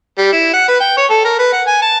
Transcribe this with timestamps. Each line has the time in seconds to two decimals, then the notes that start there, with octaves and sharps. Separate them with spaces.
0.19 G3
0.32 E4
0.54 F#5
0.69 B4
0.80 G5
0.97 C#5
1.10 A4
1.25 A#4
1.39 B4
1.53 F#5
1.67 G#5
1.82 A5